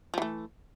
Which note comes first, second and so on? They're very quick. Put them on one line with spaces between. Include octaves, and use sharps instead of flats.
F3 E3 A3